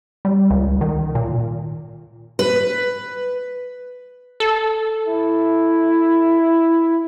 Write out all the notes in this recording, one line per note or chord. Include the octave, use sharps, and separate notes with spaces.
G3
C#2
D#3
A#2
B4
A4
E4